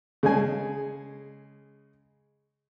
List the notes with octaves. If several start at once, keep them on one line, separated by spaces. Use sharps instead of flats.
C#3 G#3 G#5